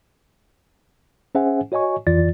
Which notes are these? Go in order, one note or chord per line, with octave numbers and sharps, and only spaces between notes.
C#4 G#4 C5 E5 F#5 G#5
F#4 C#5 D#5 G#5 C#6
F2 E3 F4 D5 A6